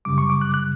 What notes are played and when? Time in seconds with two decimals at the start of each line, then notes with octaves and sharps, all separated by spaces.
0.05 F#2 C#3 G3 D6
0.18 C#6
0.30 D6
0.41 F#6
0.54 F#6